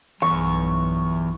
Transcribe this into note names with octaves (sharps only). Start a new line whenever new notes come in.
B1 E2 G2 C#6